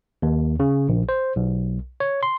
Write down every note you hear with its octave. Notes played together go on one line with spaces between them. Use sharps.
D#2
C#3
A#1
C5
B1
C#5
C6